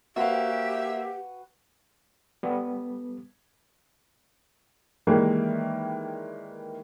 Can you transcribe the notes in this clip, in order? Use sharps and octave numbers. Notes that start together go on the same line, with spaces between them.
A#3 F#4 G4 B4 C5 E5 F5 G5
G3 B3
D#3 E3 G3 G#3 A#3